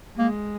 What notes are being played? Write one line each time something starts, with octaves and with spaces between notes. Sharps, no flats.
G#3 A#3